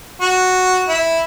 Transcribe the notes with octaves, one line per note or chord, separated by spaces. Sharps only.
F#4
E4